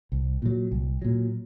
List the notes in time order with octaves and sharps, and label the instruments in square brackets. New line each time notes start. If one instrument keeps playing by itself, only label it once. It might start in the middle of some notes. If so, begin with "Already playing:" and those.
[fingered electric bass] C2
A#2 F#3
C2
A#2 F#3